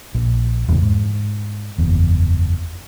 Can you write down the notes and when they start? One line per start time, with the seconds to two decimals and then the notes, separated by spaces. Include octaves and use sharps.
0.15 A#1
0.68 E1 E2 A2 C#3
0.82 G#2
1.78 F#1 E2